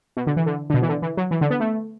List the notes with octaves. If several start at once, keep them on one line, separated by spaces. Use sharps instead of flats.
B2
D3
E3
D3
D3
B2
E3
D3
E3
F#3
E3
D3
B3
A3